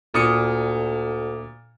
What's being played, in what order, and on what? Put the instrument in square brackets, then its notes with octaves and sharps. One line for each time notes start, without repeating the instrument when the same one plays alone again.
[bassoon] D2 [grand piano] A#2 D#6 C#7